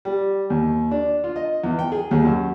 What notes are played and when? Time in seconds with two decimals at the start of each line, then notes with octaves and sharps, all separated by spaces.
0.05 G3
0.50 D#2
0.91 D4
1.24 F4
1.36 D#5
1.64 E2
1.79 G5
1.92 G#4
2.11 D#2
2.25 F#2